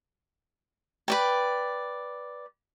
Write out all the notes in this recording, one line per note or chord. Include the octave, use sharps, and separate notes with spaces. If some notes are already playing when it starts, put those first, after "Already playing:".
B4 D5 G5